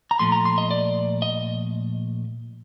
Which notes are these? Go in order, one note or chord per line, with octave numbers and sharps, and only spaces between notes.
A#5
A#2 F3 A3 C6
A#5
C6
D#5
D5
D#5